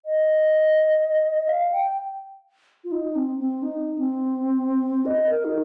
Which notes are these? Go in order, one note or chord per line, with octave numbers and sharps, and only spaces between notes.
D#5
F5
G5
F4
D#4
C4
C4
D#4
C4
D#5
A#4
D#4